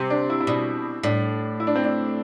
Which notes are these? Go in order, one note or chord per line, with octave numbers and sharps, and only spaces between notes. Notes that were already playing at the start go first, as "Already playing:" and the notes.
Already playing: C3 C4
D4
E4
E4
B2 D4
A2 D4
E4
D4
C4
D4